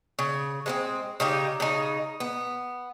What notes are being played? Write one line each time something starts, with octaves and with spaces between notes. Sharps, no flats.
C#3
G#3 B3 C4
C#3 D#4 G4
C#3 D#4
B3